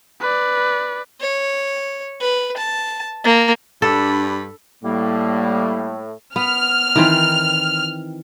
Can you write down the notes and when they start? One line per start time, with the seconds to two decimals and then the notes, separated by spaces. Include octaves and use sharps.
0.21 B4 D5
1.21 C#5
2.21 B4
2.57 A5
3.24 A#3
3.82 G2 D4 A4 B5
4.84 A2 G3 A#3
6.36 B3 F6
6.96 D#3 E3 C4